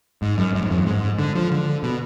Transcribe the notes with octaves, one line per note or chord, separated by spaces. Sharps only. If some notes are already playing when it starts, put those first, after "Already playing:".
G#2
F#2
F#2
G#2
F2
F#2
G#2
D3
F3
D3
B2